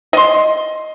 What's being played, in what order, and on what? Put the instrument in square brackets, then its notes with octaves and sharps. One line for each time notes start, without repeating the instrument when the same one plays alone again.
[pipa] D#5 C6